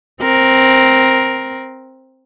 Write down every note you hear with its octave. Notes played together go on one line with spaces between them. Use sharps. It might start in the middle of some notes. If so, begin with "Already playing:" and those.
C4 A#4